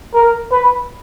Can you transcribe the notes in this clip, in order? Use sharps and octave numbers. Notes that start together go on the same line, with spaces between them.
A#4
B4